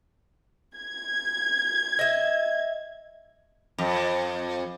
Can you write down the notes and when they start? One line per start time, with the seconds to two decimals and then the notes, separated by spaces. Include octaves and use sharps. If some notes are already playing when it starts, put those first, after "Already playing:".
0.76 G#6
1.99 D#5 E5
3.78 F2